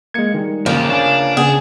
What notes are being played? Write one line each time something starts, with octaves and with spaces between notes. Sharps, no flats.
G#3 A#3 G#6 C#7
D#3 G3 G#3
G1 D#2 C#3 F3 A#3 F#7
D4 C#5 F5 G#5
C#3 B3 G#4